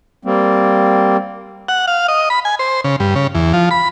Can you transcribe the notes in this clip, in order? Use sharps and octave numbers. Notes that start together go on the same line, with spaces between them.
G3 A#3 C4
F#5
F5
D#5
B5
G#5
C5
C#3
G2
C#3
E2
F3
B5